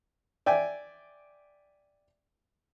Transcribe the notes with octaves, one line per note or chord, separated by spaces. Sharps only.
D5 E5 G5 G#5